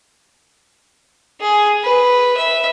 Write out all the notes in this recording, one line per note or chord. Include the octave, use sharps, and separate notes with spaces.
G#4
B4
E5